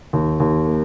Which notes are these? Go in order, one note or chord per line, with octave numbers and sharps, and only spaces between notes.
D#2
D#2
A#3